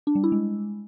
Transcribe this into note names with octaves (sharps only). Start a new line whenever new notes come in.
D4
G3
E4
G#3